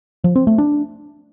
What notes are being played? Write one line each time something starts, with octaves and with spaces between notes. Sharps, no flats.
F3
C4
A3
D4